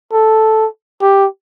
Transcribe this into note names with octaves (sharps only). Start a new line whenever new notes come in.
A4
G4